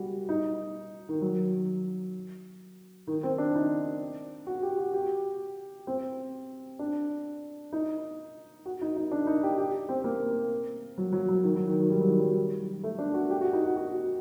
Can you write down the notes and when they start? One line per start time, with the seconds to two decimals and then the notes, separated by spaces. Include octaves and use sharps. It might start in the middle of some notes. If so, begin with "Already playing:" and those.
Already playing: G3 F#4
0.29 D#4
1.09 D#3
1.22 F#3
3.07 D#3
3.23 C4
3.38 D4
3.55 D#4
4.47 F#4
4.63 G4
4.78 F#4
4.94 G4
5.87 C4
6.79 D4
7.73 D#4
8.66 F#4
8.81 D#4
8.96 D#4
9.12 D4
9.27 D#4
9.43 G4
9.58 G4
9.89 C4
10.04 A#3
10.98 F#3
11.13 F#3
11.28 F#3
11.43 D#3
11.56 F#3
11.67 D#3
11.79 D#3
11.90 G3
12.01 F#3
12.09 D#3
12.19 F#3
12.84 A3
12.99 D4
13.14 F#4
13.31 G4
13.41 F#4
13.53 D#4
13.64 F#4
13.76 F#4